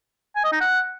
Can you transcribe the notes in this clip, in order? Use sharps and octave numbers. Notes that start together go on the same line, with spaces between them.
G#5
D#5
D#4
F#5